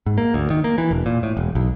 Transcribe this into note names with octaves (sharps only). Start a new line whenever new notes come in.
G#2
A#3
D2
D#3
A#3
E3
E1
A#2
A2
E1
B1